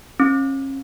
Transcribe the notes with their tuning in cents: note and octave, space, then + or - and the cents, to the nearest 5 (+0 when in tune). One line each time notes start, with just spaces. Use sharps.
C#4 -35